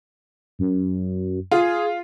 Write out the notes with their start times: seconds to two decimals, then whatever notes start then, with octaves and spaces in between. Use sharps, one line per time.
0.59 F#2
1.51 F4 G#4